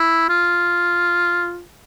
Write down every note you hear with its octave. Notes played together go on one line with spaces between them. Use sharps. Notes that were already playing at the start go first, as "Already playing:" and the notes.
Already playing: E4
F4